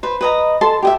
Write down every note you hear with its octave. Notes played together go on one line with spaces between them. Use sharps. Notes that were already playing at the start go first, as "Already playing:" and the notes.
B4 C5
B4 D#5 A#5
A4 A5 C6
G4 D#5 E5